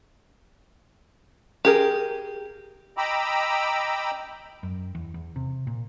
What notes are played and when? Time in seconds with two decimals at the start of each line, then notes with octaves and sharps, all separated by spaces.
1.65 G4 G#4 A#4
2.97 D#5 G5 A#5 B5 D6 E6
4.63 F#2
4.95 E2
5.14 E2
5.36 C3
5.67 A#2